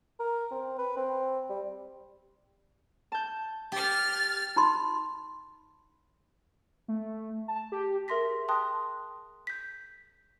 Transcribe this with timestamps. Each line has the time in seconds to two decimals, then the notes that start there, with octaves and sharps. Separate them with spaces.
0.19 A#4
0.51 C4
0.78 B4
0.96 C4
1.49 G3
3.12 A5 G6
3.72 G4 F6 A6
4.56 D#4 B5 C6
6.88 A3
7.48 A5
7.72 G4
8.08 G#4 A#4 E5 C6 A#6 B6
8.48 G5 A5 C6 D#6 F#6
9.47 G6 B6